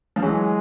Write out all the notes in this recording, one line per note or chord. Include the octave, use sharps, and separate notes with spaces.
F3
E3 F#3 G#3